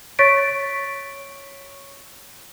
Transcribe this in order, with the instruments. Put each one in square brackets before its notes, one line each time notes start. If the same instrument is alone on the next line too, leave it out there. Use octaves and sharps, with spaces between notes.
[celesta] C#5 C#6 A6 B6 D7